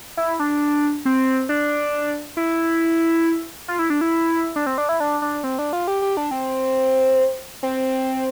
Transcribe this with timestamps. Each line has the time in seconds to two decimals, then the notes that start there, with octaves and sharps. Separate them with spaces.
0.17 E4
0.40 D4
1.05 C4
1.49 D4
2.37 E4
3.68 F4
3.79 E4
3.90 D4
4.01 E4
4.56 D4
4.66 C4
4.78 D4
4.89 E4
5.00 D4
5.22 D4
5.44 C4
5.59 D4
5.73 F4
5.88 G4
6.02 G4
6.17 D4
6.31 C4
7.63 C4